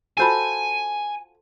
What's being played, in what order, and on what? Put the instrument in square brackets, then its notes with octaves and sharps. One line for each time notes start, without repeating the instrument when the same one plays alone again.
[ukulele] F4 F#4 B5 [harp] A4 C5 A5 [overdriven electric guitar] G#5